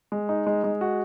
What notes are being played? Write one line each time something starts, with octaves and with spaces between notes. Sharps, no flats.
G#3
D#4
G#3
G#3
F#4